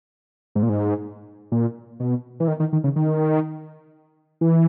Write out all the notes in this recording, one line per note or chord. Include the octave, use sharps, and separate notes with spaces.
G#2
A#2
G#2
A#2
B2
E3
D#3
D#3
D#3
C#3
D#3
E3